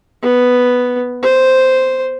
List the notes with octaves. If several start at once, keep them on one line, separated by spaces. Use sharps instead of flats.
B3
C5